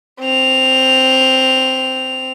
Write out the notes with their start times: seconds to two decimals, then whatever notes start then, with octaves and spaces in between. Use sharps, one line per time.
0.20 C4 F7